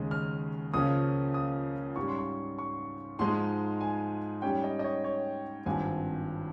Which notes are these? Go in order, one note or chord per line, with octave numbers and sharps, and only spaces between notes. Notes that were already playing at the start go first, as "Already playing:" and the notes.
Already playing: D#2 C#3 G#3 D#4
F6
C#2 C#3 F3 A#3 C#4 D#6
D#6
G#2 G3 C#4 C#6
C6
C#6
C#6
G#2 F3 G#3 D#4 C6
G#5
G#2 G3 C#4 G5
D#5
D#5
C#5
C#5
G#1 G2 F3 C4 G#5